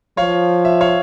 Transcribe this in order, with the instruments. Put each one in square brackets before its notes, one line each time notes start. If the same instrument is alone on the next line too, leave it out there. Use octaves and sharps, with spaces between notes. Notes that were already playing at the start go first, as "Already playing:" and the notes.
[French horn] F3 [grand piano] C#5 F5
[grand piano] E5
C#5 F5